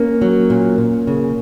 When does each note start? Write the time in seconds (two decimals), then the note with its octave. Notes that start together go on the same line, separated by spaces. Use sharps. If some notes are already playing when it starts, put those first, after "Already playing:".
Already playing: A#3 C#4
0.22 F#3
0.50 A#2
0.78 A#2
1.07 C#3